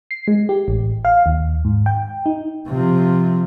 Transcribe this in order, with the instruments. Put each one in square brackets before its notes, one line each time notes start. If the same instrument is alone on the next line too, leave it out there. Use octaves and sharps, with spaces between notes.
[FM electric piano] C7
G#3
G4
A1
F5
D#2
G#2
G5
D#4
[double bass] C3 F3